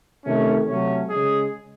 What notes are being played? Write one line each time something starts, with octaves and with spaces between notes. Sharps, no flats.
C3 D#3 A3 C#4
C3 F#3 A3 C#4
C#3 G#3 G#4